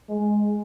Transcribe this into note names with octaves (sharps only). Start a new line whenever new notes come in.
G#3